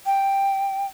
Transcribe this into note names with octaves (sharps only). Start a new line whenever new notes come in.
G5